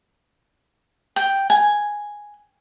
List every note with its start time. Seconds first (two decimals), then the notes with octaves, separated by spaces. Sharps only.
1.16 G5
1.50 G#5